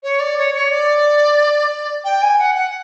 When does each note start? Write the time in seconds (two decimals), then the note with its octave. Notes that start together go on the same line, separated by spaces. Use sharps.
0.03 C#5
0.20 D5
0.38 C#5
0.54 C#5
0.70 D5
2.04 G5
2.22 G#5
2.39 F#5
2.55 F#5